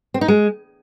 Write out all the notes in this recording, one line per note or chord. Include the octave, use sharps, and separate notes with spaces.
C4
D#4
G#3